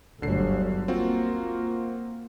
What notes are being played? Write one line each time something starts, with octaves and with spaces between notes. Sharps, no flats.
G1 D2 D3 F#3 C7
A#3 C4 F4 F#4